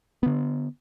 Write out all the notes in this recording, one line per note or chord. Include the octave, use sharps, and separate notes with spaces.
D3 B3